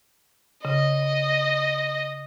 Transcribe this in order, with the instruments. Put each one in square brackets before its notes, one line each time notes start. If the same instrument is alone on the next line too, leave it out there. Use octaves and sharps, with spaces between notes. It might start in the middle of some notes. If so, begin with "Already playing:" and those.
[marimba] C#3 [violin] D#5